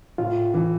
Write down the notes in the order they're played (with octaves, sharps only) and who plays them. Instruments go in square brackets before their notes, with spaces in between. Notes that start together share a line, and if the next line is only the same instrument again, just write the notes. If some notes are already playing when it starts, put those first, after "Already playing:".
[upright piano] A2 [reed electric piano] F4
[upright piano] E3